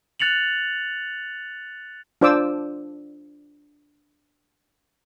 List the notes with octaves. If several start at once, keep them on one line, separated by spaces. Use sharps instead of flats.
F#6 A6 C#7 F7 F#7
D4 F4 C5 D5 D6 E6